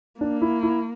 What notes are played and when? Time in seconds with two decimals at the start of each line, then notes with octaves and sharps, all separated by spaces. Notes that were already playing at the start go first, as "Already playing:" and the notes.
0.20 A#3 D4
0.42 E4
0.63 E4